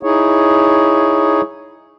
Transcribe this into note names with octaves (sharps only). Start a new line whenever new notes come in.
D#4 E4 G#4 C#5